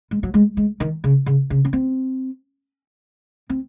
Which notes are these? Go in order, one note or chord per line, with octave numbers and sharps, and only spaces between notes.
G#3
F#3
G#3
G#3
D#3
C#3
C#3
C#3
C#4
C4
C4